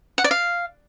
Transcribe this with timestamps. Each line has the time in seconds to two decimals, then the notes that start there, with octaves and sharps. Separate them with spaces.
0.18 F#5
0.24 D5
0.31 F5